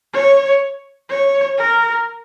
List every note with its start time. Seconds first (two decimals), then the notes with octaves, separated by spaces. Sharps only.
0.13 C#5
1.10 C#5
1.58 A#4